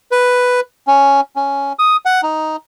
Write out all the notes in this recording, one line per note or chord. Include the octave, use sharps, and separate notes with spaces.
B4
C#4
C#4
D#6
F#5
D#4